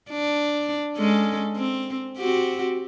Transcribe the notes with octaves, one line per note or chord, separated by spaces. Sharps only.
D4
G#3 C#4 A4
C4
C4 F#4 G4